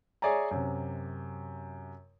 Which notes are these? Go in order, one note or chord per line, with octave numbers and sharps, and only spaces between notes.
G#4 C#5 D5 E5 G#5 A#5
F#2 C3